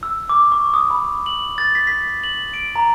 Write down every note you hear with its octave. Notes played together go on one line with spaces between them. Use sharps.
E6
D6
C#6
D#6
B5
F#7
A6
B6
B6
F#7
D7
A#5